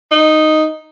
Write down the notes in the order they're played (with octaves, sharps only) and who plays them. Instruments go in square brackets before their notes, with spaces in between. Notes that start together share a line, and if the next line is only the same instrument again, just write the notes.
[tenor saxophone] D#4